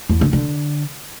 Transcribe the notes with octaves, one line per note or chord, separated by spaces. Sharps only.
E2
D3
D3